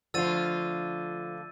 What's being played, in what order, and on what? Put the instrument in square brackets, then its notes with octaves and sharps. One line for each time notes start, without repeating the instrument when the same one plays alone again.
[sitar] D3 A3 F4 [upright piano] F3 [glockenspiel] E6 A6 D#7